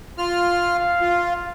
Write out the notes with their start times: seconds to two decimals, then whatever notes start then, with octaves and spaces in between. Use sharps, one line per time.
0.18 F4 F6
0.53 F5
1.01 F4